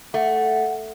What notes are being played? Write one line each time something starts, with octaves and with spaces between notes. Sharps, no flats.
A3 F#5